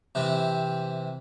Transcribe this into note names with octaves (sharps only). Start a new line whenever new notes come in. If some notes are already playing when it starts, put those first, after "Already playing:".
C3 E3 C4